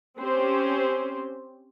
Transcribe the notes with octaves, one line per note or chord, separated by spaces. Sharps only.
C4 C#4 G4 C5